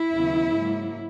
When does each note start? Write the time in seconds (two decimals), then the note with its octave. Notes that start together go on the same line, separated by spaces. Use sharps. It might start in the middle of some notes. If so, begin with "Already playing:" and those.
Already playing: E4
0.12 D#2 C#3 F#3 B3
0.52 G#2 F#3 A#3